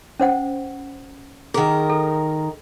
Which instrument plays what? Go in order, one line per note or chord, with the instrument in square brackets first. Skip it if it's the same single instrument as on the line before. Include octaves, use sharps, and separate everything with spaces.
[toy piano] C#4 C5 F#5
[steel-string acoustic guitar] D#3 A#4 [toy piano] G#4
[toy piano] A4